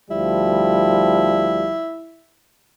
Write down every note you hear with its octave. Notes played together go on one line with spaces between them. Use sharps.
D2 F3 G3 E4